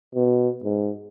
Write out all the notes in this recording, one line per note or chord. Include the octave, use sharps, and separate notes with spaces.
B2
G#2